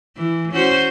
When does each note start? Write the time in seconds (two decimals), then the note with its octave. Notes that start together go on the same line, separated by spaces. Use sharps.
0.17 E3
0.52 C#4 F#4 C5